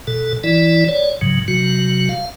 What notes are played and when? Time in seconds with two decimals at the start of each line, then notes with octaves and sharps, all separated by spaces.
0.07 B2 A4
0.44 E3 E4 D5
0.89 C#5 D5
1.21 G#2 C#3 F#3
1.48 C3 F#3 F#4
2.09 F5